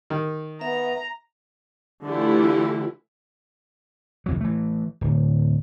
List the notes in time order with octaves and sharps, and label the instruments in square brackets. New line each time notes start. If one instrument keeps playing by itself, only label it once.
[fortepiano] D#3
[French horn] B3 [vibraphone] E5 [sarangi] A#5
[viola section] D3 E3 A3 E4 F4 G4
[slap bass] C2 F2 F#3
E3 A3
D1